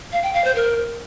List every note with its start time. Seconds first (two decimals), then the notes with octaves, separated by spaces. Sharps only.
0.12 F5
0.23 G5
0.34 F5
0.44 C5
0.55 A#4